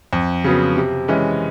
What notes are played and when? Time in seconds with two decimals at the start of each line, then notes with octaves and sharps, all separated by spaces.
0.13 F2
0.44 C#3 F#3 B3
0.76 C3
1.08 E3 G#3 C#4